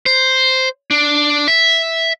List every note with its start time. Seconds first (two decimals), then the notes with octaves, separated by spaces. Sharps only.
0.06 C5
0.91 D4
1.48 E5